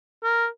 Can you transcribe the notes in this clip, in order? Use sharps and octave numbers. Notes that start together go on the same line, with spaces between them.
A#4